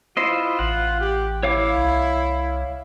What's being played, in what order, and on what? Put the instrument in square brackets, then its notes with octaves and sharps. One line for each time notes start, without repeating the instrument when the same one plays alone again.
[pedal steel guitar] E4 C5 D#5 [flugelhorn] F4
[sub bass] A1 [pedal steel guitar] F#5
[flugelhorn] G4
[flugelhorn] E4 [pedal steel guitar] C#5 F5 D6
[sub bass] C2